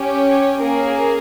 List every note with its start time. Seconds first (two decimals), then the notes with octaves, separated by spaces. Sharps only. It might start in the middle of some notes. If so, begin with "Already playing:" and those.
Already playing: C#4 G4
0.27 C#5
0.61 A#3 C#4 G#4 A#4